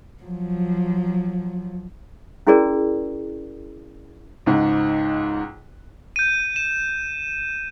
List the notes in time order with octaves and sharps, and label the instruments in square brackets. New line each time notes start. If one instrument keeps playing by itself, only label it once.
[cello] F3 F#3
[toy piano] C#4 E4 F#4 G#4 A#4 D5
[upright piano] C#2 G#2
[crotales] G6 D#7
E7